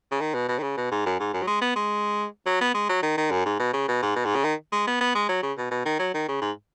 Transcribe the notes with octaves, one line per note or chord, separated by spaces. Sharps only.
C#3
D#3
B2
B2
D#3
C#3
B2
G#2
F#2
G#2
F#2
F#3
G#3
B3
G#3
F#3
B3
G#3
F#3
D#3
D#3
F#2
G#2
B2
C#3
B2
G#2
B2
G#2
C#3
D#3
G#3
B3
B3
G#3
F#3
C#3
B2
B2
D#3
F#3
D#3
C#3
G#2